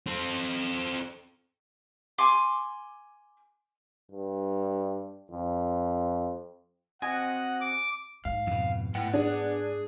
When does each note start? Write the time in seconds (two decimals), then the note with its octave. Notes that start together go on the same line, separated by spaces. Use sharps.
0.07 C4 A4
2.18 G#5 C6 D6
4.12 G2
5.31 F2
7.02 C4 F#4 D#5 F#5 G#5
7.61 D6
8.25 G#2 F5
8.47 F2 B2
8.95 A2 B3 F#5 G5
9.14 D4 G#4